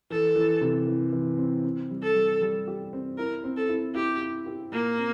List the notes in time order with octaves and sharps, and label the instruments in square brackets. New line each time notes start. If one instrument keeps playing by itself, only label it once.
[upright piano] E3 [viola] A4
[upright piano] E3
C3
E3
E3
C4
C4
G3
[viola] A4
[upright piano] G3
G3
G4
C4
[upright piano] E4 [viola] A#4
[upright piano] C4
[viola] A4
[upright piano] E4
[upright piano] E4 [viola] G4
[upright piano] E4
G4
[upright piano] A#2 [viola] A#3
[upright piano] C4